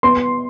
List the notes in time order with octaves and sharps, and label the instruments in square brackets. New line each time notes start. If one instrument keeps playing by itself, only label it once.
[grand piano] B3 C6